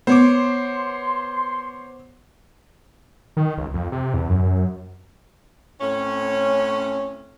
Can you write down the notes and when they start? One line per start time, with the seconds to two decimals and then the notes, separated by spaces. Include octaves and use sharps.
0.07 B3 C5 C#5 C6 D6
3.37 D#3
3.57 C#2
3.74 F2
3.92 C3
4.14 E2
4.29 F#2
4.43 F#2
5.81 A2 C4 C#4